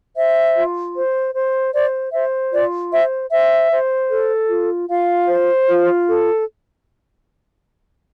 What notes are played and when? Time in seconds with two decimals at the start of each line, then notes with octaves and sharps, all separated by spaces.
0.16 C5 E5
0.55 F4
0.95 C5
1.34 C5
1.74 C5 D5
2.13 C5 E5
2.53 F4 D5
2.92 C5 E5
3.31 C5 E5
3.71 C5
4.10 A4
4.49 F4
4.89 F4 F5
5.28 C5
5.68 F4
6.07 A4